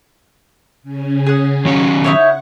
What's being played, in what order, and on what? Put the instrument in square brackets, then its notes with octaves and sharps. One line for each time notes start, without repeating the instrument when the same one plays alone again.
[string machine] C#3 C#4
[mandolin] G#4 F#5
[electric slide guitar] D#3 F#3 C#4 [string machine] C#6 F#6
[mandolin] D#4 E4 C#5 [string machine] F#5